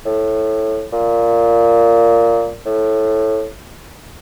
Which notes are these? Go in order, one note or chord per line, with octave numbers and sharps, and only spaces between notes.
A2
A#2
A2